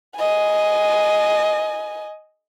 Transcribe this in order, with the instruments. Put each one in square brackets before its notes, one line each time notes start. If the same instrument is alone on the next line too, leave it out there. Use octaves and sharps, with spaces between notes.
[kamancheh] D#5 G#5